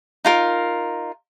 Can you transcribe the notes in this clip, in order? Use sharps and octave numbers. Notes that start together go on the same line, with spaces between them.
D#4 F4 A#4